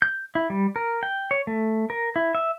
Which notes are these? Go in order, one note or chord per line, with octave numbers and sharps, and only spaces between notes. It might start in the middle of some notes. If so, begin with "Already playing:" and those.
G6
E4
G3
A#4
G5
C#5
A3
A#4
E4
E5